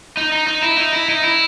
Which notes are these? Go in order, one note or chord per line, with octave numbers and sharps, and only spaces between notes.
D#4
D#4
D#4
E4
D#4
E4
D#4
E4